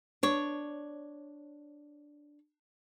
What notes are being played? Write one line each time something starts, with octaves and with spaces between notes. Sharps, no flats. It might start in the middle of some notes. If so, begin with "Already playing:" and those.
D4 C#5